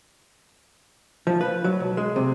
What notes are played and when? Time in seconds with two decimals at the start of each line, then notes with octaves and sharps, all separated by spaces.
1.27 F3
1.41 B4
1.64 F#3
1.80 B1
1.97 G#3
2.16 C3